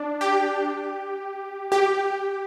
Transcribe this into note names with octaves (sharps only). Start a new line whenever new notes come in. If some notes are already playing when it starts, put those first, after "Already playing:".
Already playing: D4
G4
G4